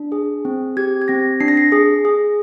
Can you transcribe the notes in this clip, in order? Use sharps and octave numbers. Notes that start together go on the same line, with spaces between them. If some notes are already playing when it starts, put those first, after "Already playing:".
Already playing: D4
G#4
C4
G4 G#6
G#6
C4 A#6
D4 C7
A#6
C7
G#4
G#4